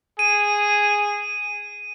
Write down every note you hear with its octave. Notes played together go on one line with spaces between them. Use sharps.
G#4 D#7